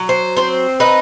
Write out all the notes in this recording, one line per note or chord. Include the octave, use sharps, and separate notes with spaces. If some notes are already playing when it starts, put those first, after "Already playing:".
Already playing: F#3
C5
C4 C5
D#4 B4